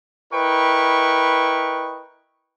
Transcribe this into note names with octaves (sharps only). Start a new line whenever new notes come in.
E4 A#4 B4 D#5 G5 C#6